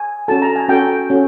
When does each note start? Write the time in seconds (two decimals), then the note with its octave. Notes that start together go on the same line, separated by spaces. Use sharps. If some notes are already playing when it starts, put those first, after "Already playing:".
Already playing: G#5
0.28 C#4 F#4 A4 A5
0.42 A#5
0.56 G#5
0.69 C#4 F#4 A4 G5
1.10 C#4 F#4 A4